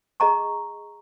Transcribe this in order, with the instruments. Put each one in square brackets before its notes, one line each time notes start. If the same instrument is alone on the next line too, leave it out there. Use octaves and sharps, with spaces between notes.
[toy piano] G#4 D#5 A#5 C#6